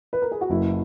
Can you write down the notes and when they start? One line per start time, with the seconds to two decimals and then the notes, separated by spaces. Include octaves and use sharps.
0.13 B4
0.22 A#4
0.32 G#4
0.41 F#4
0.50 F#1 E4